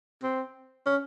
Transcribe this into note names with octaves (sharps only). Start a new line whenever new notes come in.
C4
C#4